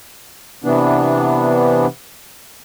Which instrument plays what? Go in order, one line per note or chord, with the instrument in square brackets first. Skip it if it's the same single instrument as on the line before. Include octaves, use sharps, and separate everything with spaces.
[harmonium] C3 E3 B3 D4